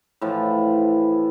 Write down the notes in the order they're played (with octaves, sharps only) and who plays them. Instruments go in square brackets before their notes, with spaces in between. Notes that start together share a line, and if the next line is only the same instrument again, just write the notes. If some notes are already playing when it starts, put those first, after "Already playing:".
[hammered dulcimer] A2 E3 F3